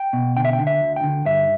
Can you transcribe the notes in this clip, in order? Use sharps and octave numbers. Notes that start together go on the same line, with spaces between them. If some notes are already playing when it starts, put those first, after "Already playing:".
Already playing: G5
B2
D3 G5
E5
G5
D3
E5
D2
G5
D3
G2 E5